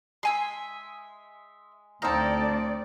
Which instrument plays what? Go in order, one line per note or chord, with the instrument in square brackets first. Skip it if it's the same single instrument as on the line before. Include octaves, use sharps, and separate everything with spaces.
[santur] G#3 [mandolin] E5 G#5 C6
[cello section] D2 D5 [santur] C4 D#4 F5 [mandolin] A4 A#5